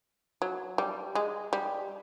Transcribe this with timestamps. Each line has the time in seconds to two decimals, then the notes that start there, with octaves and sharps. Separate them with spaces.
0.42 F#3
0.78 G3
1.15 G#3
1.53 G3